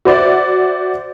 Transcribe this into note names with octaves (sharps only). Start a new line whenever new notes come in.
F#4 C5 D5 E5